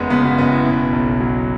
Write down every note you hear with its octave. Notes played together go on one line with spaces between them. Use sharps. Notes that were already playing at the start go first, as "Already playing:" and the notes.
Already playing: F#1 E2 G#3 B3
C#3 B3
F#4
F#1 B3
E4
B2
B1
F#3